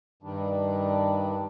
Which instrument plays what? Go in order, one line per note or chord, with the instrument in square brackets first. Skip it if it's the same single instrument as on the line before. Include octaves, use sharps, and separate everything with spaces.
[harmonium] G2 D#3 G3 D4